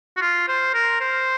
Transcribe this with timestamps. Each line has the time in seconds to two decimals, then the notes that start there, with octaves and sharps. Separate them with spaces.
0.17 F#4
0.22 F4
0.48 C5
0.74 A#4
1.01 C5